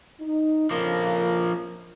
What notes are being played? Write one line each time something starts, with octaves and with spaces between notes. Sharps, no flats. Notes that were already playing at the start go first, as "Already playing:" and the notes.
D#4
F2 C#3 F3 A#3 A#4